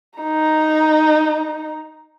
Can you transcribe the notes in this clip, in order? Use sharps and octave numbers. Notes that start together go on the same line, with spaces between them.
D#4 A#5